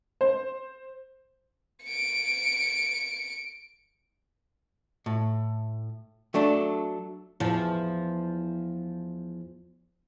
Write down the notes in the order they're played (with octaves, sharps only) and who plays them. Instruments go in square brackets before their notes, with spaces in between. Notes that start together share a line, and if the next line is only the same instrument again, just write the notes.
[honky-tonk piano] C5
[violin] C#7 D7
[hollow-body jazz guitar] A2
F#3 A3 D4
[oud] E2 F3